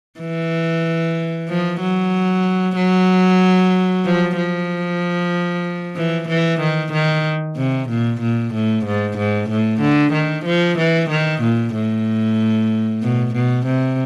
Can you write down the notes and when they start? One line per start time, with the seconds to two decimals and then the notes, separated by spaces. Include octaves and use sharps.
0.20 E3
1.49 F3
1.80 F#3
2.76 F#3
4.05 F3
4.36 F3
5.96 E3
6.29 E3
6.61 D#3
6.93 D#3
7.57 C3
7.89 A#2
8.21 A#2
8.54 A2
8.86 G#2
9.18 G#2
9.50 A2
9.81 D3
10.13 D#3
10.45 F3
10.78 E3
11.10 D#3
11.42 A#2
11.74 A2
13.03 B2
13.34 B2
13.66 C3